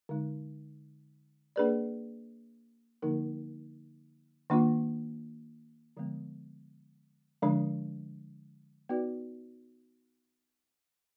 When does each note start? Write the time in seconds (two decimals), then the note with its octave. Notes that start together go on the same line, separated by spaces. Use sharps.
0.09 D3 G#3 D#4
1.56 A#3 D4 G#4 B4 D5
3.02 D3 F3 A#3 D#4 A#4
4.50 D#3 A#3 D4 F4
5.97 D3 F3 G#3 B3
7.42 D3 F3 G#3 D4
8.89 B3 D#4 F#4 B4 D5